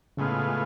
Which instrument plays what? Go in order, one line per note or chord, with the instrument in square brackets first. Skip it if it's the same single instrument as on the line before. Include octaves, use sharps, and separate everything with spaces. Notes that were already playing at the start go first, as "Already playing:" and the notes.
[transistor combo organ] A2 G#3 B3 F4 [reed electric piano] C#3